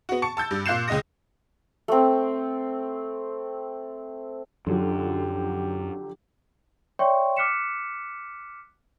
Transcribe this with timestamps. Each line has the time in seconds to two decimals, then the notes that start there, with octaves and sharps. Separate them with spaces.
0.09 B3 F#4
0.22 A5 C#6 C#7
0.37 A5 E6 G6 A6
0.51 G2
0.66 A#2 F5 F#6 G6 C7 E7
0.88 C#2 G#3 D#5 D#6 A#6
1.88 A3 C4
4.67 F#2 D3 F3 F#3 G4
6.99 C#5 D5 E5 G5 C6 C#6
7.36 D6 F6 F#6 B6 C#7 E7